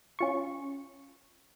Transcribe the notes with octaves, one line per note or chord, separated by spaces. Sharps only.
C#4 F4 C#6